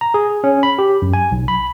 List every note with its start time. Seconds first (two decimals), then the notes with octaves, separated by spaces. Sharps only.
0.01 A#5
0.14 G#4
0.44 C#4
0.63 B5
0.78 G4
1.02 F#2
1.13 G#5
1.32 B1
1.48 B5